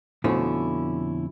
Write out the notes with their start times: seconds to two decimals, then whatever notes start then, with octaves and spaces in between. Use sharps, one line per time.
0.24 F2 B2 D3 A3 C#4 E4